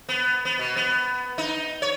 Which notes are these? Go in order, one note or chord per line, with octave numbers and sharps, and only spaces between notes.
B3
B3
B2
B3
D#4
C#5